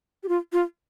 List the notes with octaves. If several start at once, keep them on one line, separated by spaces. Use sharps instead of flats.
G4
F4
F4